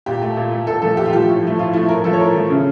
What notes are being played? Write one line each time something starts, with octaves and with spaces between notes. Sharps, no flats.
A#2 G4
A3
A#2
A3
A#2 A4
F3 A3 A4
A#2 G4
F4
F3 A3 G4
A2
F3 A3
A2 F4
F3 A3 E4
A2 A#4
F3 A3 A4
C#5
A2 A#4
F3 A3
C#3